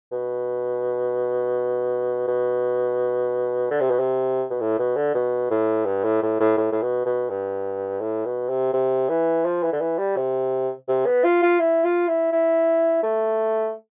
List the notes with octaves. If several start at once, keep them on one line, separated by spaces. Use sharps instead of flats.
B2
B2
D3
C3
B2
C3
B2
A2
B2
D3
B2
A2
G2
A2
A2
A2
A2
A2
B2
B2
G2
A2
B2
C3
C3
E3
F3
E3
D3
E3
G3
C3
C3
B3
F4
F4
E4
F4
E4
E4
A3